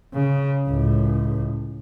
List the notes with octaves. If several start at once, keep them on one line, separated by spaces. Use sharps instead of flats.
C#3
C#2 A2